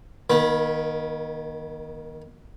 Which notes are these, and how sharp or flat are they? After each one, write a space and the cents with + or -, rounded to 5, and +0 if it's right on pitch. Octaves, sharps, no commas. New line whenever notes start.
D#3 +0 A#3 +45 B5 -15